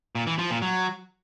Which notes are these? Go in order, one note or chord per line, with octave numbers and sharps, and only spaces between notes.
A#2
E3
F3
A#2
F#3